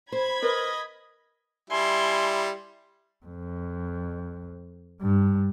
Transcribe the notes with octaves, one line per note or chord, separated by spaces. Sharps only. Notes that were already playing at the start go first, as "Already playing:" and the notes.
C5 B5 G#6
A#4 B4 D#5
G3 E4 G#5 C6
F2
G2